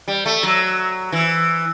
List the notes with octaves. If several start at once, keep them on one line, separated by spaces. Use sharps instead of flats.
G3
A3
F#3
E3